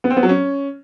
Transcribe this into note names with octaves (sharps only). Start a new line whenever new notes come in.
B3
C4
B3
F#3
C#4